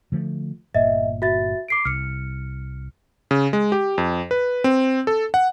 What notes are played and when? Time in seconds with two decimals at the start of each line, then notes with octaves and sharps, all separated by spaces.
0.12 D3 F3 A3
0.75 G1 A#2 D#5 E5
1.22 F#4 E5 A6
1.68 D6 C7 D7
1.85 C2 F6 C#7
3.31 C#3
3.53 G#3
3.72 G4
3.98 F2
4.31 B4
4.64 C4
5.07 A4
5.34 F#5